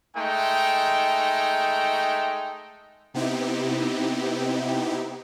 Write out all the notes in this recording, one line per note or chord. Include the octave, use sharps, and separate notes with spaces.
G#3 A3 D#4 G5
C3 B3 C4 D#4 E4 G4